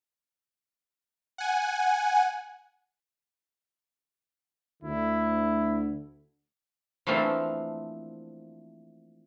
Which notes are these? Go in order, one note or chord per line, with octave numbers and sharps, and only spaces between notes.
F#5 G#5
D2 D3 E4
E3 F3 A3 A#3 C4 D4